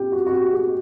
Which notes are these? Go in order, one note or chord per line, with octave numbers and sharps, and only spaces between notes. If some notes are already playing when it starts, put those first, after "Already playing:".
Already playing: A#2 G4
F#4
F#4
G4
G#4